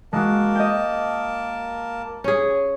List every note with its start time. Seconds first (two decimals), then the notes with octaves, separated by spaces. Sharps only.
0.13 G#3 A#3 F#4 A#4 A5
0.55 D#5 G5
2.24 C#4 G#4